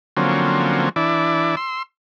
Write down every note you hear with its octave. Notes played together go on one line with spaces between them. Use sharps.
D3 F3 F#3 A#3 C4 C#4
E3 D4 E4 D5
C6 E6